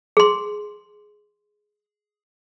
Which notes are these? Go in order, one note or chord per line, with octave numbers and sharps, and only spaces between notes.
G#4 C6